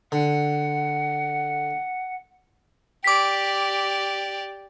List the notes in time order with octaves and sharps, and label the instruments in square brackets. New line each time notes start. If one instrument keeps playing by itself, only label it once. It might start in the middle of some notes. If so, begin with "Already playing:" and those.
[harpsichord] D3 [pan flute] F#5
[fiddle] G4 D5 [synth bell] D6 B6